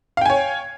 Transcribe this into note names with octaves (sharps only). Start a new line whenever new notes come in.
C#5 F5 G5 G#5